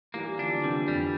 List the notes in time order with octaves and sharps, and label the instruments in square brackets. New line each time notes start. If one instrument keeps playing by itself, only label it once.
[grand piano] E3 G3 [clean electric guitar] A#3
[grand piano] D3 F3 [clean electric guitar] D4
[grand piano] C3 E3 [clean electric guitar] G3
[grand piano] F2 [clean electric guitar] G3